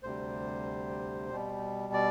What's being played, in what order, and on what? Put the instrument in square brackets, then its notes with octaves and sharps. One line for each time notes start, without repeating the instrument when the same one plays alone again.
[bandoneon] D2 C3 G3 C5
B2 G3
D5